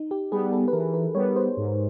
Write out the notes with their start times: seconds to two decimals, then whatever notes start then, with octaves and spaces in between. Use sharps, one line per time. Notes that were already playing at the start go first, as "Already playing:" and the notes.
Already playing: D#4
0.11 G4
0.32 G3 B3 G#4
0.52 A4
0.68 B4
0.73 E3 A#4
0.94 B4
1.14 G3 B3 C#5
1.36 C5
1.57 G#2